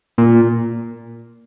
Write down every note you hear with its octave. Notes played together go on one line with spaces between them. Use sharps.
A#2